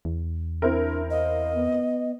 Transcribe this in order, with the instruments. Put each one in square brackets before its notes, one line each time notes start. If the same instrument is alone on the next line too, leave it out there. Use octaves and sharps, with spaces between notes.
[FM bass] E2
[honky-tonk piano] C4 E4 A#4 [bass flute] D4
[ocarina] D#5 [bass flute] F5
[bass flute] B3